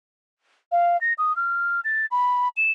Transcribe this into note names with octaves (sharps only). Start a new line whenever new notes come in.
F5
A#6
D#6
F6
A6
B5
E7